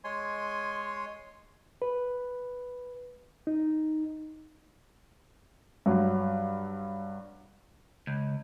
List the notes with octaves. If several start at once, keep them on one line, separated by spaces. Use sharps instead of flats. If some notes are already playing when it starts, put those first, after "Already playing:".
G#3 C#5 G#5 C6
B4
D#4
G2 F#3
C#2